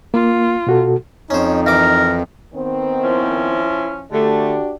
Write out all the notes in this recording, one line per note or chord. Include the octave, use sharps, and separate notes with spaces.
A#3 F4
B2 F#4 A4
F2 C#4 D#4 C5
E3 A#4 D6
D#3 B3 C4
F3 C#4 E4
D3 A3 D4 F#4 G4